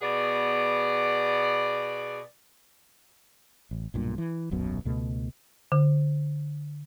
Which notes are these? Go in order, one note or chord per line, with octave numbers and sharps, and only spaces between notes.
B2 B3 G#4 D5
A1
B1 G2 A#2
E3
D#1 B1 F#2 B2
C#2 B2 A3
D3